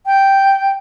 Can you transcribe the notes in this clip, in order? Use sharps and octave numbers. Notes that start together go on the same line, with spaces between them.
G5